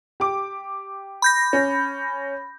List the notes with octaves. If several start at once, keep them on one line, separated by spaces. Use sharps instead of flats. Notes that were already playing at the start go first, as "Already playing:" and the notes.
G4 D6
B5 G6 A#6
C#4